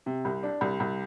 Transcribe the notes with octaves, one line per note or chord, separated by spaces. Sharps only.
C3
C2
D4
C2
C2